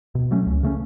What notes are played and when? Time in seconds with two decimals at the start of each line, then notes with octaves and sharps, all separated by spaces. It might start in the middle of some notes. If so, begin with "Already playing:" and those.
0.15 B2
0.31 F#3 A3 C#4
0.47 C#2
0.63 C#3 A3 C#4